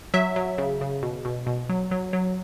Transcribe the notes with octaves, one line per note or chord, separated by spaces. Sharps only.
F#3 E5
F#3
C#3
C#3
B2
B2
B2
F#3
F#3
F#3